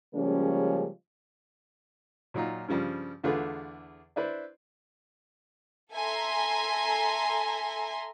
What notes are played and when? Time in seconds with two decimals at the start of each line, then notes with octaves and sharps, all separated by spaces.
0.14 C#3 F3 G3 G#3 A#3 C#4
2.34 A#2 F#3 D#4 F4
2.68 G2 C#3 F3 G3
3.24 E2 D3 A3 F4 G#4 B4
4.16 D4 E4 B4 C5 D5
5.92 A4 E5 G#5 A#5 C6